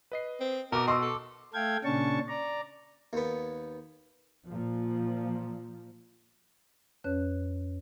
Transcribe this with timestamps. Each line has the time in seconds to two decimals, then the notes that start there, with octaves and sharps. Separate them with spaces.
0.12 B4 D#5 C7
0.40 C4
0.72 B2 A#4 A#5 D6
0.88 D#5 C6 C#6 E6
1.01 A4
1.54 A3 A4 F5 G5 G#6
1.84 A#2 C#3 C#4 D4 A5 C#6
2.28 D5 A#5
3.13 D#2 B3
4.48 A#2 F3
7.04 F2 C#4 B4 C#5 F#6